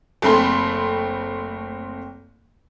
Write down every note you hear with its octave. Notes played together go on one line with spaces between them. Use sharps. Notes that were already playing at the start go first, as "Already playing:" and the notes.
F#1 A3 C4 B5 C6